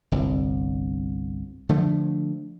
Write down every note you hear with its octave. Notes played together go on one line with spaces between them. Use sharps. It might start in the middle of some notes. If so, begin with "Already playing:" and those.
G1 C2
D3 F3 A3